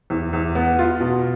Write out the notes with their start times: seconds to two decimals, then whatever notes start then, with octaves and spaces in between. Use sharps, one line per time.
0.10 E2
0.33 E2
0.55 B3
0.79 F4
1.01 B2